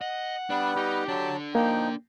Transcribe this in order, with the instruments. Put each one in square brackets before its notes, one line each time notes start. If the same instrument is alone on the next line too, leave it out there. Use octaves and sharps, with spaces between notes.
[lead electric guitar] D#5 [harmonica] F#5
[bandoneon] G3 B3 B4 [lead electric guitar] D4
[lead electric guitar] D#4 [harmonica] G4
[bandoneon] F#3 A5 [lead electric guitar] D4 A4
[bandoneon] F3 D#4 [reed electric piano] A#3 [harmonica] G5